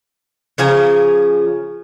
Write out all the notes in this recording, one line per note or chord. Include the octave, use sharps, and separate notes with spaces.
C#3 F3 G#5 A#5